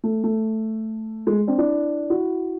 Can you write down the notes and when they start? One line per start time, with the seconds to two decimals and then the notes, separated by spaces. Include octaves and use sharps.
0.04 A3
0.24 A3
1.27 G#3
1.47 C4 D4
1.58 D4 E4
2.10 E4 F#4